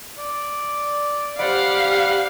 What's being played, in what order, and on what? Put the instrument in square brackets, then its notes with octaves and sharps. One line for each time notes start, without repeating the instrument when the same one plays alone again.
[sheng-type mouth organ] D5
[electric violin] G4 F5 [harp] C5 D5 [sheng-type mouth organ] F#5 B5